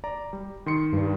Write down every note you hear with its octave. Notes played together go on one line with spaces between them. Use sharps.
D5 A#5
G3
D#3 C6 C#7
G2